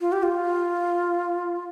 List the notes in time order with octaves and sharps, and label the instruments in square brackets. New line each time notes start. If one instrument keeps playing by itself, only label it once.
[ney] F4
G4
F4